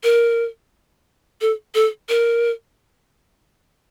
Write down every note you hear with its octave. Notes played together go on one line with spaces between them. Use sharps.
A#4
A4
A4
A#4